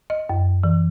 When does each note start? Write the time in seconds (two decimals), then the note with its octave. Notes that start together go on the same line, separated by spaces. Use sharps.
0.10 D#5
0.29 F#2
0.63 E3